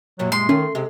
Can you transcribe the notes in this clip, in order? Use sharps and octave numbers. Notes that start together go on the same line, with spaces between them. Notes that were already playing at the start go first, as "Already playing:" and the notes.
F#2 A#2 F#3 G3
G#3 C6
D#3 A3 C#4
C3 G#3